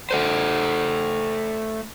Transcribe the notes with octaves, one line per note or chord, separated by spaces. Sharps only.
A3 A4 C5